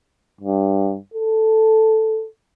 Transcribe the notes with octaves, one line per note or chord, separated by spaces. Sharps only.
G2
A4